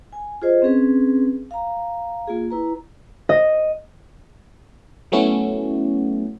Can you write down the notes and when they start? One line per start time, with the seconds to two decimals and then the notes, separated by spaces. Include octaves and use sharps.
0.13 G#5
0.42 F4 G#4 C5 D#5
0.62 C4 C#4 G#4 B4
1.51 F5 A#5
2.27 A#3 F4 G#4
2.50 E4 B4 A#5
3.29 D#5
5.12 F#3 A3 B3 C#4 E4 F#4